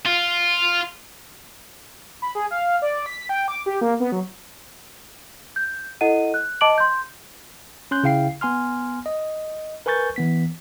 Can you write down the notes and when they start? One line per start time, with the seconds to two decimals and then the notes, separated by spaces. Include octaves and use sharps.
0.06 F4
2.22 B5
2.35 G#4
2.51 F5
2.82 D5
3.06 B6
3.29 G5
3.48 D6
3.66 G4
3.81 A#3
4.00 B3
4.12 F#3
5.56 G6
6.01 E4 A4 D#5 F#5 D#7
6.34 F#6
6.61 D#5 A5 D6 D7 F#7
6.78 C6 G6
7.91 C#4 C6 F#6 G6
8.03 C#3 E4 F5 G5 C7
8.41 B3 G#5 C6 F6
9.06 D#5
9.86 A#4 B4 G#5 C#6 G6 A6
10.16 E3 B3 B6